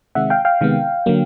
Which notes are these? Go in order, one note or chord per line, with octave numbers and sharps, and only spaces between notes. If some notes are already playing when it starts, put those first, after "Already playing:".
C3 D#3 G#3 C4 E5 F#5
F5 G5
F5 G5
C3 D#3 G#3 B3
D3 F#3 A#3